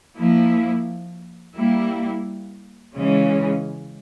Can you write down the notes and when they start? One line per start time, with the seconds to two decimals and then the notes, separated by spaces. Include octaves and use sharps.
0.15 F3 A#3 E4
1.55 G3 A#3 E4
2.95 C#3 E3 G#3 C#4